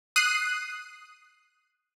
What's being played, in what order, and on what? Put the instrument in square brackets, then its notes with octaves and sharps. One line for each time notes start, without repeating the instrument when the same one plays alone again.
[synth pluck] D#6 F#6 C7 D#7